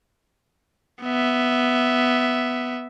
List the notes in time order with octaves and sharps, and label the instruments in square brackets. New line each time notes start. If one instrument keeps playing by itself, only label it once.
[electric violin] B3 E5